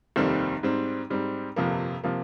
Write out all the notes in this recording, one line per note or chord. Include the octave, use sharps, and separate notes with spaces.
F1 D#2 D#3 G3 C4
G#2 G3 C4
G#2 G3 C4
G1 F2 C3 F3 A#3
C3 F3 A#3